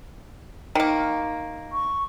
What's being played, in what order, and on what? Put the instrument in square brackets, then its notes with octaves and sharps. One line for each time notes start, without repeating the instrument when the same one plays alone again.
[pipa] D#3 A#3
[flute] C#6